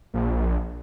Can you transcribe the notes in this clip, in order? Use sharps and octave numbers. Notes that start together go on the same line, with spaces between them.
A#1